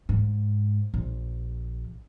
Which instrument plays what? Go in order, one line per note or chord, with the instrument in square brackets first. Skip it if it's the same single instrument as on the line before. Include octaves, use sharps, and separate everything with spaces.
[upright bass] G#2
A#1